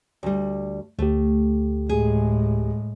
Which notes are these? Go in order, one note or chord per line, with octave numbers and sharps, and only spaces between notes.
D2 G3
D2 A3 G4
A2 G#3 G#4